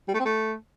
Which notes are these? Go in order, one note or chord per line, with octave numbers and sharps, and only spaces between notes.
G3
A3
C4
A3